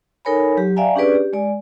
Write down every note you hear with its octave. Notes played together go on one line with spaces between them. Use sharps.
D#4 A4 A#4 C#5 G#5 B5
F#3 G4
D5 E5 F5 G5 G#5 A#5
C#4 D4 G4 G#4 B4 D5
G4
G#3 D5 G#5